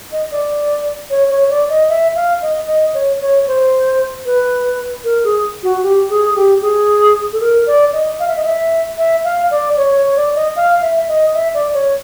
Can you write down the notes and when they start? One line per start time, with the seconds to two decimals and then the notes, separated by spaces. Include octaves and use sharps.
0.12 D#5
0.32 D5
1.10 C#5
1.30 C#5
1.50 D5
1.69 D#5
1.89 E5
2.15 F5
2.42 D#5
2.68 D#5
2.94 C#5
3.21 C#5
3.47 C5
4.26 B4
5.04 A#4
5.24 G#4
5.63 F#4
5.83 G4
6.10 G#4
6.30 G#4
6.36 G4
6.62 G#4
7.33 A4
7.41 A#4
7.67 D5
7.93 D#5
8.19 F5
8.28 E5
8.36 D#5
8.44 E5
8.98 E5
9.24 F5
9.51 D5
9.77 C#5
9.97 C#5
10.16 D5
10.35 D#5
10.56 F5
10.82 E5
11.08 D#5
11.34 E5
11.54 D5
11.74 C#5